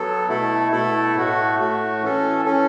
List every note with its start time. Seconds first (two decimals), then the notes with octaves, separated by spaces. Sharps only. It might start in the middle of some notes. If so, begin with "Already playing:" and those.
Already playing: F#3 B3 A4
0.29 B2 A3 E4 A4
0.72 B2 A3 E4 A4
1.15 A2 A3 F#4
1.59 A2 A3 F#4
2.02 E3 C#4 A4
2.45 E3 C#4 A4